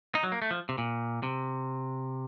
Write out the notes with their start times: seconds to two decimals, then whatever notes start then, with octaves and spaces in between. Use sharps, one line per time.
0.15 D#4
0.24 F#3
0.32 A#3
0.42 A3
0.51 F3
0.69 C3
0.78 A#2
1.23 C3